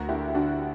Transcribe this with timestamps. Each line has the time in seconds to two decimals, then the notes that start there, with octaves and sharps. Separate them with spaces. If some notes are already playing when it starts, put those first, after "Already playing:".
Already playing: D2 F#4 A#4
0.09 D3 E4 G4
0.34 D3 D4 F#4